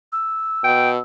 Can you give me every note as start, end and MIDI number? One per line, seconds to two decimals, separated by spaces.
0.12 1.02 88
0.64 0.98 47
0.64 0.90 79